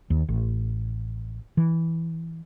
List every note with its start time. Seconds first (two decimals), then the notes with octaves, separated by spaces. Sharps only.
0.10 D#2
0.29 A1
1.57 E3